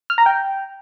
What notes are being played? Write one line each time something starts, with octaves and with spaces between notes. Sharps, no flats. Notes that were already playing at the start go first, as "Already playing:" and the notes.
F6
A#5
G5